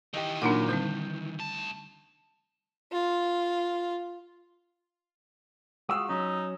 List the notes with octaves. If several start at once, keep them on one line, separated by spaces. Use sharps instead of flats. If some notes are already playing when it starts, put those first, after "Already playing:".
D#3 E3 G4 D#5
A#2 F#3 A#3 D4 D#4 F#5
D3 G3 C4 G6
D2 A5
F4
G#3 F4 F#4 D#6 E6
F#3 C#4 D#4